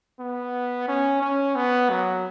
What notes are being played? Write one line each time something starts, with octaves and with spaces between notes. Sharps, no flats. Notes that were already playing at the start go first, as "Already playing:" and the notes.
B3
C#4
C#4
B3
F#3